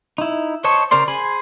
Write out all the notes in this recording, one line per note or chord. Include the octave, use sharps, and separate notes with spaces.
D#4 E4
C5 C#5 D#5 A5 C#6
C#3 A#4 C5 D5 C6
G#4 C5 G#5 B5